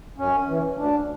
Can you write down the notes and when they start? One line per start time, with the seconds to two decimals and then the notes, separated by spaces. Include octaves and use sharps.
0.18 F#2 C#4
0.48 E3
0.77 D2 D4